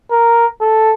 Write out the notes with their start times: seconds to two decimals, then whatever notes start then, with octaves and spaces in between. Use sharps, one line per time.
0.11 A#4
0.61 A4